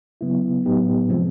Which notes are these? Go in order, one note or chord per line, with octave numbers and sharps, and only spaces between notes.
C#3 F#3 B3 E4
A2 F#3 B3 D#4 G4
C3 F3 G#3 C4